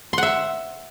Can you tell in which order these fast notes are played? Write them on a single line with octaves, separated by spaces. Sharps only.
C6 F#5 E5